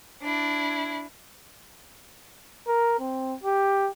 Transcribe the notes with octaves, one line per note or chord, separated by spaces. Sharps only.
D4 E4
A#4
C4
G4